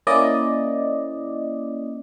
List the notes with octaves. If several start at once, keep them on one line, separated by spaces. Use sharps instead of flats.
A#3 C#4 E4 D5 D#5